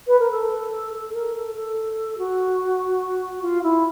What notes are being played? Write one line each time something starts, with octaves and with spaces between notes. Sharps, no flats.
B4
A#4
A4
A4
A#4
A4
A4
F#4
F4
E4